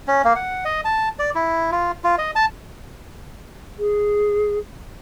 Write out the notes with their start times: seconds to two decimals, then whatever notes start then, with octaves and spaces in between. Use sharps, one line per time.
0.08 C#4
0.24 A#3
0.36 F#5
0.65 D#5
0.85 A5
1.19 D5
1.35 E4
1.72 F4
2.04 F4
2.18 D#5
2.36 A5
3.79 G#4